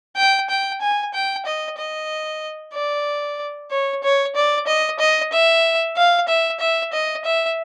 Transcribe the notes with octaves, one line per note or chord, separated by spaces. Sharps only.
G5
G5
G#5
G5
D#5
D#5
D5
C#5
C#5
D5
D#5
D#5
E5
F5
E5
E5
D#5
E5